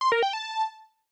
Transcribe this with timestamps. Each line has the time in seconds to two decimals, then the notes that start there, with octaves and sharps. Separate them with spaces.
0.01 C6
0.12 A#4
0.23 G5
0.33 A5